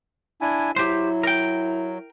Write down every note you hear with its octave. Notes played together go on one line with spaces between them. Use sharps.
D4 E4 G#5
F#3 E4 G4 C5
A#4 G5